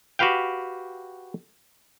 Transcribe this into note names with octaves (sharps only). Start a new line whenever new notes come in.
F#4 G4 B4 F5 G5